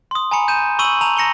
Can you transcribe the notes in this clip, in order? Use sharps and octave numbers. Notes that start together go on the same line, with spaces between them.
C6 D#6
G#5 A#5 B5 C#7
G6 D#7 E7
B5 C#6 E6 D#7 F#7
A5 A#5 D#7 F7
A#5 A#6 C#7 F7 G7